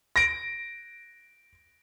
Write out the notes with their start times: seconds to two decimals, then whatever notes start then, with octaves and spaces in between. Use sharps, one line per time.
0.16 A#6 D7